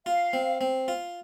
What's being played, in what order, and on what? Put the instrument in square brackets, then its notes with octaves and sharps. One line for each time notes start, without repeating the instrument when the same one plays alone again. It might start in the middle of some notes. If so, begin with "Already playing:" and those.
[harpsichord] F4 [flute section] F5
[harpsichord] C4
C4
F4